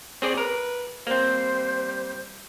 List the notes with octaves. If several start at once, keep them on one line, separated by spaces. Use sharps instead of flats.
C4 G#4 C#5 D5
A#4 B4
G3 A#3 C4 C5